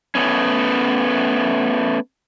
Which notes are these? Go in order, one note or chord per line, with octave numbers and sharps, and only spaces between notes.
A3 B3 C#4